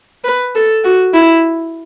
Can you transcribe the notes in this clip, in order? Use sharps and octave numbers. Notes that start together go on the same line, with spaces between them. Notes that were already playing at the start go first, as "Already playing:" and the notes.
B4
A4
F#4
E4